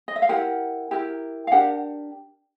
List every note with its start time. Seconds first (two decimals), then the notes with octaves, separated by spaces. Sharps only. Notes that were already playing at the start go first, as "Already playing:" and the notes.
0.08 D#5
0.16 E5
0.22 F5
0.29 E4 G4 A#4 F#5
0.91 E4 G4 A#4
1.47 F5
1.52 D4 G4 A#4 F#5